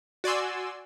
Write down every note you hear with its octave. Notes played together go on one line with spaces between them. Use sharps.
F#4 D5 G#5 C6 E6